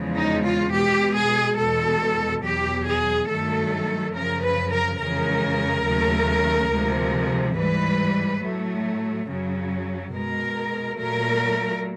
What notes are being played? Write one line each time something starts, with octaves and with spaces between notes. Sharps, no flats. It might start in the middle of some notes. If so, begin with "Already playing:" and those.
Already playing: E2 C#3 F3 G#3
D#4
F4
B2 G#3 G4
G#4
E2 B2 G#3 A4
E2 B2 F#3 G4
G#4
G2 D#3 F#3 A3 A4
F#2 C#3 F3 A#4
B4
A#4
F2 C#3 E3 G#3 A#4
D#2 C#3 F#3 A3
D2 C3 F3 G#3
G#2 E3 G3 B4
A2 F#3 A3
F#2 C#3 F#3
B2 G#3 A#4
A#2 F#3 A3 A#4